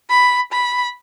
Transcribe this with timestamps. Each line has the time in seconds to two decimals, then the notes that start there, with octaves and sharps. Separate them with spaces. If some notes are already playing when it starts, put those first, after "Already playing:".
0.10 B5
0.52 B5